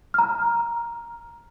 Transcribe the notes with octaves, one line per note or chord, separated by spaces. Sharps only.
A#5 F6